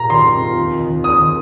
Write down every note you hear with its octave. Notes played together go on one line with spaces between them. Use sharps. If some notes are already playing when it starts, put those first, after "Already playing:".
Already playing: A#2 A#3 F4 G4 A#5
D#3 C6
C4
F4
D#2
D#3
D#3
A#3 D#6
D#3